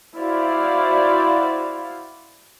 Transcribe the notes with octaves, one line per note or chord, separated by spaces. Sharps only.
E4 F#4 C5 D5 F5